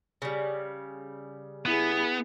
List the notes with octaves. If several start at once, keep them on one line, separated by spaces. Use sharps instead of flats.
C#3 G3
B3 E4 G#4